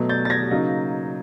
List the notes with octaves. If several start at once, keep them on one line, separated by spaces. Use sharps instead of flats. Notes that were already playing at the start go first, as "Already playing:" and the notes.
Already playing: B2 F#3 A3
G6 A6
A6
G#6 A#6
C#3 F#3 A#3 D#4